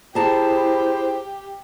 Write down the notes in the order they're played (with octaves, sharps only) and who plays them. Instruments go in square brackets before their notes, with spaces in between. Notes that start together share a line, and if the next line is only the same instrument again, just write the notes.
[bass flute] E4 [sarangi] G4 [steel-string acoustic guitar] G#4 A5 A#5 [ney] C5